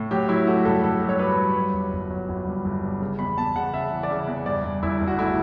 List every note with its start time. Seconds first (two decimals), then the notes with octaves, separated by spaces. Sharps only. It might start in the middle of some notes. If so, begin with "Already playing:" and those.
Already playing: A2
0.11 F#3 G4
0.29 F#3 E4
0.47 A3 F#4
0.65 G2 A4
0.84 G2 A4
1.02 F#3
1.09 C#5
1.19 G2 B4
1.38 F#3
1.56 G2
1.74 G1
1.93 G1
2.10 F#3
2.29 G1
2.47 G2
2.65 G1
2.83 G2
3.01 C#3
3.19 E2 B5
3.37 E2 A5
3.56 C#3 F#5
3.74 C#3 E5
3.92 E3
4.03 D5
4.10 C#3 E5
4.27 E2
4.46 G2 D5
4.64 G2
4.83 G1 E4
5.01 G1
5.07 F#4
5.19 A3 E4